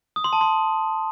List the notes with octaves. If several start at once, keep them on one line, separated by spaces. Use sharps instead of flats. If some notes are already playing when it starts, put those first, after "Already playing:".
D#6
C6
A5
C6